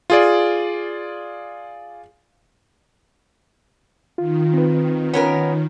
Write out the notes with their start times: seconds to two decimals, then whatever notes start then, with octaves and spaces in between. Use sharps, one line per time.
0.10 F4 G#4 D5
4.18 D#3 F4
4.54 C4 B4
5.13 B3 C#4 A#4 C#5